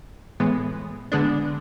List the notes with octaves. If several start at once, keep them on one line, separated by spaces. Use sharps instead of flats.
A2 E3 G#3 B3
D3 G#3 B3 D4